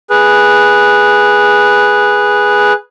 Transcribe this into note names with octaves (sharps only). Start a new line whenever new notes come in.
G#4 B4